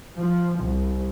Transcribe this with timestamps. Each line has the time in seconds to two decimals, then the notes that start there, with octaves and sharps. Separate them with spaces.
0.19 F3
0.62 C2